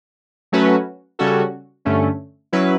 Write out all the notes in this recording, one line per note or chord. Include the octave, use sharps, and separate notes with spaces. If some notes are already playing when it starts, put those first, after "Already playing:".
F#3 A3 C#4 F#4 B4
C#3 G3 C#4 F#4 A4
G2 D3 A3 C#4
F#3 C#4 E4 B4